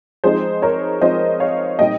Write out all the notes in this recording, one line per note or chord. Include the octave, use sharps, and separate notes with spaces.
F3 G#3 C4 D#4 G#4 C5
A#4 C#5
F3 G#3 C4 D#4 C5 D#5
C#5 F5
A#2 G3 C4 D#4 D#5 G5